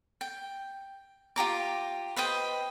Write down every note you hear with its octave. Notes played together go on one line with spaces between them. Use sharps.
G5
F4 G4 A#5 D6
B4 C5 D#5 G5